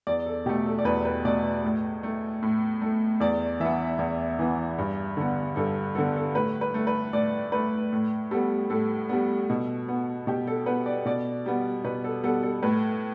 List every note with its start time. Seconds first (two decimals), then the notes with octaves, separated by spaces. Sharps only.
0.07 E2 D5
0.26 A4
0.46 B2 A3 G4
0.66 A4
0.79 D5
0.85 E2 B4
1.05 B4
1.25 B2 A3 D5
1.64 A2
2.03 A3
2.42 A2
2.82 A3
3.20 E2 D5
3.60 E3 B3 E5
3.99 E2
4.39 E3 B3
4.78 G2
5.17 D3 B3
5.56 G2 A4
5.95 D3 B3 A4
6.16 A4
6.35 A2 B4
6.61 B4
6.74 A3
6.87 B4
7.13 A2 D5
7.52 A3 B4
7.93 A2
8.31 G3 B3 A4
8.70 A2 A4
9.09 G3 B3
9.50 B2
9.88 B3
10.27 B2 G4
10.47 A4
10.66 B3 B4
10.86 D5
11.06 B2 D5
11.46 G3 B3
11.84 B2 B4
12.04 A4
12.23 G3 B3 A4
12.43 A4
12.63 A2 B4